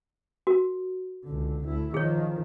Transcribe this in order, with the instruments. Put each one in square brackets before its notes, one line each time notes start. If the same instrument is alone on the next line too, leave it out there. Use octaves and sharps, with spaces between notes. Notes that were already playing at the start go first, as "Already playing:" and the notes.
[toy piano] F#4 A#4
[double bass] C#2 D3
D2 E4
[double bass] D#3 F3 [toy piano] G#4 C#5